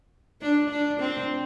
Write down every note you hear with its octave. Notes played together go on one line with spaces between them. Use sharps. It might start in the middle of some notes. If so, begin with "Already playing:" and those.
D4
D4
C4